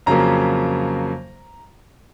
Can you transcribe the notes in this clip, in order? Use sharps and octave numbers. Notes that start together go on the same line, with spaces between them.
F2 C#3 F#3 A#3 A#5